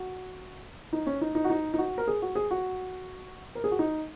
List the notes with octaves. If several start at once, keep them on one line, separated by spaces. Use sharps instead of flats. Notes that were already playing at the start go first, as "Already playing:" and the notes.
Already playing: F#4
D#4
C#4
D#4
D#4
F#4
D#4
D#4
F#4
A#4
G#4
F#4
G#4
F#4
A#4
G#4
F#4
D#4